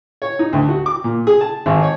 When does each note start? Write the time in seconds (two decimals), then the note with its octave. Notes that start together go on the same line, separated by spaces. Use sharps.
0.22 C#5
0.39 D#4
0.53 D2
0.68 F#4
0.86 D6
1.04 A#2
1.27 G#4
1.41 A5
1.66 G#1
1.83 C#5